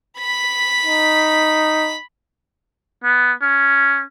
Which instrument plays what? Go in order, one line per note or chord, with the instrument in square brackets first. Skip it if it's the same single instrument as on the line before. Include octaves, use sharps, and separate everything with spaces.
[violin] B5 B6
[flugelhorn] D#4
[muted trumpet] B3
C#4